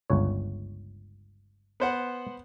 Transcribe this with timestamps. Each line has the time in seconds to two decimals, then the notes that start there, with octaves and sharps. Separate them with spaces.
0.10 G1 C#2 C#5
1.80 B3 C5 F#5